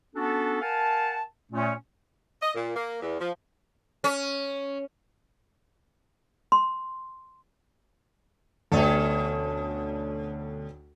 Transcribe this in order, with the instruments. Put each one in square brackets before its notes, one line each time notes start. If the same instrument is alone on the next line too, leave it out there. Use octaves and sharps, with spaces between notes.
[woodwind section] B3 C#4 D4 F#4 A4
A#4 F5 F#5 G#5 A5
A#2 A3 C#4
[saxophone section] D#5
A#2
A#3
E2
F3
[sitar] C#4
[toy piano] C6
[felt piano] D2 D5 G5 [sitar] B2 C#4 A4